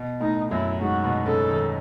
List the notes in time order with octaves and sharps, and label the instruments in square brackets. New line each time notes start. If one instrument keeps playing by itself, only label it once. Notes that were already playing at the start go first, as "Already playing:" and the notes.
Already playing: [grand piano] B2
[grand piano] A2 [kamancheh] D#4
[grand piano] F#2 F#3 [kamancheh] E4
[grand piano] G#2 G#3 [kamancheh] F#4
[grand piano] B2 B3
[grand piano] C#3 C#4 [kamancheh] A4
[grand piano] D#3 D#4